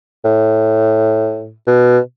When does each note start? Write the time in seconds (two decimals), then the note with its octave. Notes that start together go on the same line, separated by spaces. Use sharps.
0.25 A2
1.67 B2